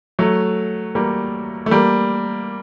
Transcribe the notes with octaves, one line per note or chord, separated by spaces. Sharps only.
F#3 A3
G3 A#3
A3
G3 A#3